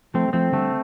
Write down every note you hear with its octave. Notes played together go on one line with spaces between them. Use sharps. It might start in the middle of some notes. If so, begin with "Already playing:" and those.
F3 A3 C4
G3
F3 A3 C4
D3 G3 A3